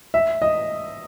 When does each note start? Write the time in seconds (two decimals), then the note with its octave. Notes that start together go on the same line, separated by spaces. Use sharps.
0.14 E5
0.42 D#5